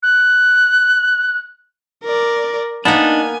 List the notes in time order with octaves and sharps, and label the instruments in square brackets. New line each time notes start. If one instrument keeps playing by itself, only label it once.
[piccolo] F#6
[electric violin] A#4 D5
[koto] A#3 B3 [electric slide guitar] D4 D#4 [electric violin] G#5